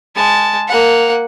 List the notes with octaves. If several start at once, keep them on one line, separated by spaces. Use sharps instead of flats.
G#3 A5
A#3 F#5